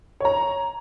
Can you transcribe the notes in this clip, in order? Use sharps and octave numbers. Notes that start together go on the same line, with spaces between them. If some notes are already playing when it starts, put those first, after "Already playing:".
C#5 A#5